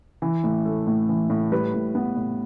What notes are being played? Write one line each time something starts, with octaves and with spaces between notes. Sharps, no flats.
E3
A2
A3
A2
E3
A2
G3 B4
A2
B3
A2